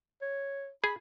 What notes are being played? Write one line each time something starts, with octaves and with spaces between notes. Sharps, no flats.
C#5
G#4 B5